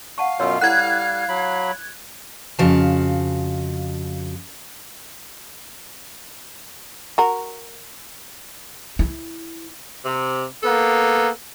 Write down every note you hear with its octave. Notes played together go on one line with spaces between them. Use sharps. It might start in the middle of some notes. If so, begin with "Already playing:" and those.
F5 F#5 A5 C#6
F#2 B2 F4 C#5 E6
G3 E4 A4 F#5 F#6 G#6
F#3 B5
F2 C#3 F#4 F5 A5
F#4 A#4
E4
C3
A#3 B3 A4